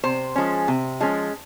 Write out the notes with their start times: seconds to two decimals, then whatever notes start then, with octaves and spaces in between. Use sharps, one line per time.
0.04 C3 C5
0.36 F3 G#3 C#4
0.68 C3
1.00 F3 G#3 C#4